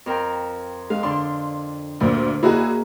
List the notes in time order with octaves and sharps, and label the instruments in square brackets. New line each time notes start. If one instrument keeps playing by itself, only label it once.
[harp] F2 A#4 G5
[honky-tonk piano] G#3 [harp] F5
[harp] D3 D4 [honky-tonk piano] C6
[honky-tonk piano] D2 A#2 [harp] D3
[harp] A#3 D#4 [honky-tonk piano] E4 F#4 G#4